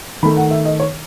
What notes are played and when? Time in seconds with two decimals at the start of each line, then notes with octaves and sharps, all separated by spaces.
0.23 D#3 B5
0.25 A3
0.37 F#5
0.51 E5
0.65 D#5
0.80 C#5